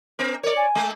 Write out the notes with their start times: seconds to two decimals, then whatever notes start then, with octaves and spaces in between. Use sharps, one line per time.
0.19 B3 A#4
0.43 A#4 C#5 D5
0.57 G#5
0.75 G#3 A#3